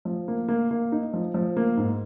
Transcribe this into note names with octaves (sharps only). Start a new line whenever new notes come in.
F3
A#3
A#3
A#3
D#4
F3
F3
A#3
G#2